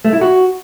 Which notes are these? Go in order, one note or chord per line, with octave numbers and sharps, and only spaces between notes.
A3
E4
F#4